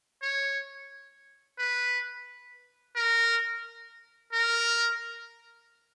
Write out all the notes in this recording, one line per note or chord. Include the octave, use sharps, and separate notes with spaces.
C#5
B4
A#4
A#4